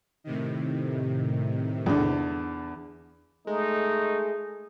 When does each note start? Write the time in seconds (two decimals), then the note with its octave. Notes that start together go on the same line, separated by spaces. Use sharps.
0.24 A2 C3 D#3
1.86 E2 D3
3.47 G#3 A3 D#4